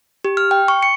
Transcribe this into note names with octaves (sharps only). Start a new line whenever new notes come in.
G4
F6
G5
C#6
C#7